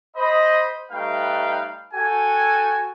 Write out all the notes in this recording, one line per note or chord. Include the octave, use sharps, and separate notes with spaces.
C5 D#5 B5
G3 A3 D#4 B4 F5 G5
F#4 A4 G5 G#5